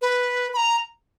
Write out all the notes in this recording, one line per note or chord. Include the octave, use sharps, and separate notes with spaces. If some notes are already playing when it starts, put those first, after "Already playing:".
B4
B5
A#5